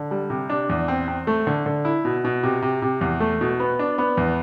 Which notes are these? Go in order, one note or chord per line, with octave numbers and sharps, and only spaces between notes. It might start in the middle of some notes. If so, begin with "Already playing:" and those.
Already playing: D3
G3
C3
D4
E2
C4
C4
A3
D3
D3
E4
B2
B2
C3
C3
C3
E2
A3
B2
B3
D4
B3
E2